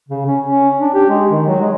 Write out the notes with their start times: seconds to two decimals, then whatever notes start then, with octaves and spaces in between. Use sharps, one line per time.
0.08 C#3
0.26 C#4
0.47 C#4
0.80 D4
0.94 G4
1.09 G#3
1.30 D#3
1.47 F#3
1.60 G#3